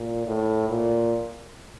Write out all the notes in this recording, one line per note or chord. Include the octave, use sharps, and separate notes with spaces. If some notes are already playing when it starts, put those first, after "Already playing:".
Already playing: A#2
A2
A#2